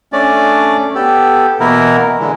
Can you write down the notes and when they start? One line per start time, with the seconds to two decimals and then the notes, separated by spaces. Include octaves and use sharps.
0.13 A3 C#4 D4 D5
0.95 B3 G4 A4
1.60 B2 E3 A#3 B3 E4 A#4
2.20 D3 E3 G#3